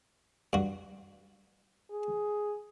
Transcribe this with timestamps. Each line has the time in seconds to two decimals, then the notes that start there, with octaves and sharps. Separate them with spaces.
0.53 G2 F#4
1.91 G#4